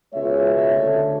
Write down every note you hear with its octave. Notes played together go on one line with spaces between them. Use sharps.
C#2 B2 G#3 C#5 E5
D2 D3 A3